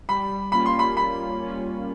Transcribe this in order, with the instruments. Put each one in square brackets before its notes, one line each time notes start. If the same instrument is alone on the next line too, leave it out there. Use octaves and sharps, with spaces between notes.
[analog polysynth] G3 [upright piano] B5
[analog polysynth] A#3 C#4 F4 [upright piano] B5
[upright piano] C6
B5
[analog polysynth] G3 [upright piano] B5
[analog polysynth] A#3 C#4 F4